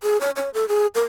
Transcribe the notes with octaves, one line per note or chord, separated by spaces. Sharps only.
G#4
C#5
C#5
A4
G#4
A#4